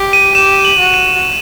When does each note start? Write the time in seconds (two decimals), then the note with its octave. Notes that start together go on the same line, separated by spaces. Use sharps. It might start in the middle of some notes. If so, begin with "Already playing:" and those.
Already playing: G4
0.13 D#7
0.35 G4 E7
0.65 F#7
0.79 F#4
0.94 D#7